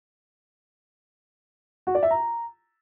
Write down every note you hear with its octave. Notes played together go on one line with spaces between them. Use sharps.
F#4
D5
E5
A#5